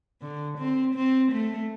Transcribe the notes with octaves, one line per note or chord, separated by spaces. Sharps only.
D3
C4
C4
A3